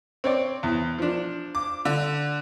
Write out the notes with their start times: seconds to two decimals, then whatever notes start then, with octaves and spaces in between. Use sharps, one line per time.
0.24 C4 C#5 D5
0.63 E2
0.98 F3 D4
1.55 D6
1.85 D3